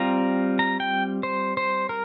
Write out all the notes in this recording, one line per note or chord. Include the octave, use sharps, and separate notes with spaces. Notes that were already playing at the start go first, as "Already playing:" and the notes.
Already playing: G3 C4 F4 A#5
A#5
G5
C5
C5
A#4